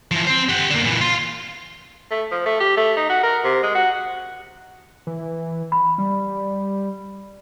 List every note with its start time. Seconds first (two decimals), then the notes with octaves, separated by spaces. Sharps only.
0.11 E3 F3
0.27 C4 C5
0.49 G4 F#5
0.70 D3 A#3
0.84 A#2 E3
1.01 F5 C6
2.11 A3
2.31 F3
2.46 A3
2.60 G4
2.77 A3
2.97 D#4
3.10 F#4
3.23 A#4
3.44 C3
3.63 G#3
3.75 F#4
5.07 E3
5.72 B5
5.98 G3